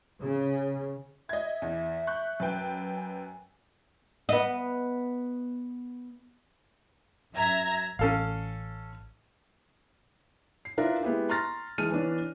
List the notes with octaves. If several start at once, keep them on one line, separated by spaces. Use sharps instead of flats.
C#3
D#5 E5 G#6
E2
C#6 F#6 G6
F#2 B4 G5
G#5
B3 D#5
F#2 E5 A#5 G#6
A1 C#4 A4 F5
C7
D4 E4 F4 A#4 B4 E5
G#3 B3 E4 G4
A#5 C6 C#6 F6 A6 A#6
E3 G#3 A5 F6 D#7
E3 B3 D4 C#5